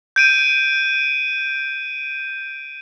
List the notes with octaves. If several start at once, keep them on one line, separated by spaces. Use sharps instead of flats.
G6 D7 D#7